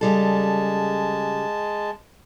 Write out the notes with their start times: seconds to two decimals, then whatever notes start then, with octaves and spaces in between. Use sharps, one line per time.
0.01 C#3 G3 G#3 A4 A5